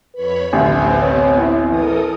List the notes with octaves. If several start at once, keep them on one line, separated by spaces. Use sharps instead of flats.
F2 B4 C#5 B5
A1 D2 C3 B3 C4
C#5
E4
E3 A4 A#4 D#6